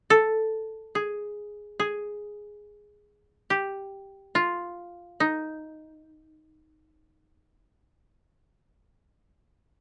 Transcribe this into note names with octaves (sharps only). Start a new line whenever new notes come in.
A4
G#4
G#4
G4
F4
D#4